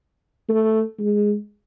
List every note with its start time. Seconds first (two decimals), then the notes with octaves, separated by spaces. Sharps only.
0.49 A3
0.99 G#3